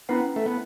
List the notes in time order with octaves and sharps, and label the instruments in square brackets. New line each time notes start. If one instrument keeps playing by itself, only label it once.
[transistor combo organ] B3 [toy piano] C#4 E4 B4 F#5
[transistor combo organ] A3
B3